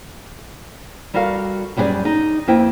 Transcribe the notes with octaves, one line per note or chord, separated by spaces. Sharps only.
G3 F#4 A4 A#4 F5
F#2 G3 E4 G#4 B4 D5
D#4
F2 A#3 C4 E4 B4 G5